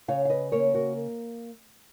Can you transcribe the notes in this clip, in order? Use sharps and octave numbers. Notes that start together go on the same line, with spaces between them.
C#3 C#5 F5
F5
B4 D#5
A#3 A#4 C#5
F#4 A#4